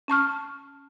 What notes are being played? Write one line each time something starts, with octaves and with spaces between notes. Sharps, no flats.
C#4 A5 C#6 F6